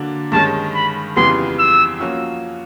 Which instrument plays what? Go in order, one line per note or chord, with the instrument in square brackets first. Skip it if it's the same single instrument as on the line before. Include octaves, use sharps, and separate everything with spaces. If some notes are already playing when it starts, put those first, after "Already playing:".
Already playing: [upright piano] D3 F#3 A#3 D4
[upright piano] G2 D#3 G#3 C#4 [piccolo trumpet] A5
[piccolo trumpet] B5
[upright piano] F2 C#3 E3 G3 B3 [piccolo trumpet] C6
[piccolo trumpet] E6
[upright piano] F3 A#3 C#4 F#4